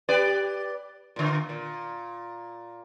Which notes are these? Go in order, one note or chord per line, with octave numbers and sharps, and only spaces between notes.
G4 B4 D5
A#2 D3
A#2